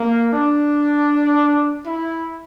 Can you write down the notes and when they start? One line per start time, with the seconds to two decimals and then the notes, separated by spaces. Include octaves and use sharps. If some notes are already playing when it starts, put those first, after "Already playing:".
Already playing: A#3
0.33 D4
1.86 E4